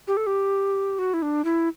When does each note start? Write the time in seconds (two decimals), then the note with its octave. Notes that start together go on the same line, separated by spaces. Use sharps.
0.07 G4
0.17 A4
0.26 G4
0.99 F#4
1.14 E4
1.22 D4
1.44 E4